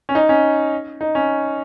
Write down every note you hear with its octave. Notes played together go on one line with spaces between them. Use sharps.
C#4
D#4
C#4
D#4
C#4